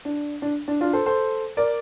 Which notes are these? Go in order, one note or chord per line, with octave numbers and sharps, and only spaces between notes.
D4
D4
D4
D4 F4
A4 C5
A4 C5
A#4 D5